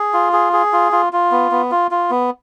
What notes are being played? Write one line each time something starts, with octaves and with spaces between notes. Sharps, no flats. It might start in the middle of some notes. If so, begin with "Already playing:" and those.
Already playing: G#4
F4
G#4
G#4
F4
F4
F4
B3
B3
F4
F4
B3